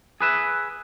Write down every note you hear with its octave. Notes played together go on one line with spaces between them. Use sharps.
G#4 B4 E5